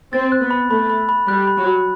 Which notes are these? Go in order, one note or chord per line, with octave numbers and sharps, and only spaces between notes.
C4 A6
F#6
B3
B5
A3 B5
B5
B5
G3 F#6
B5
F#3
B5